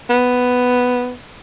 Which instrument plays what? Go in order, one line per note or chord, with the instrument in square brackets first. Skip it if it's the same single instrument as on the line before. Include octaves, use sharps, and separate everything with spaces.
[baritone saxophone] B3